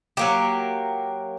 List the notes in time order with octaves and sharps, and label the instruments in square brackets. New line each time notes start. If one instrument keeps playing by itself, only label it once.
[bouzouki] F#3 A#3 G4